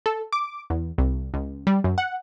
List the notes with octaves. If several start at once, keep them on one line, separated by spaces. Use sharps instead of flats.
A4
D6
E2
C2
C#2
G3
F#2
F#5